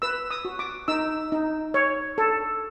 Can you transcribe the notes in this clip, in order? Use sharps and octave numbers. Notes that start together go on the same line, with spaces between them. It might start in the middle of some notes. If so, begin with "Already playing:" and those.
B4 E6
D#6
F#4
D6
D#4 E6
D#4
C#5
A4